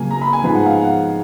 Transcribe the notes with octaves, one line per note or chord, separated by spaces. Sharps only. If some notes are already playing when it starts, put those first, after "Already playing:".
Already playing: C#3 F#3 A#3 G#5
A#5
B5
G#5
G#2 F3 G#3 B3 G#5
F#5
F5
F#5